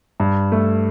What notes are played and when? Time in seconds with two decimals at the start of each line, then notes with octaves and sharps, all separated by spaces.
0.20 G2
0.52 A3